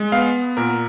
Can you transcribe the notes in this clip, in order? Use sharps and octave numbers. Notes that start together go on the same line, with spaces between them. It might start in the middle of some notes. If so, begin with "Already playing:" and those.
Already playing: G#3
B3 F5
A#2 A#4